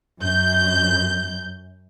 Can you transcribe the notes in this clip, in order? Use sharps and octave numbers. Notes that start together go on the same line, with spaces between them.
F#2 G6